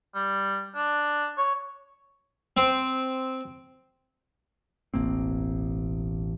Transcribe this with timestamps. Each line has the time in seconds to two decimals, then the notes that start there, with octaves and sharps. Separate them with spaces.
0.15 G3
0.75 D4
1.38 C#5
2.57 C4
4.94 E1 A1 A#3 C4